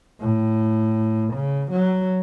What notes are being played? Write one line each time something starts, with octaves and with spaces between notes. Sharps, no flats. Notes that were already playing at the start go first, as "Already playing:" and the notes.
A2
C#3
F#3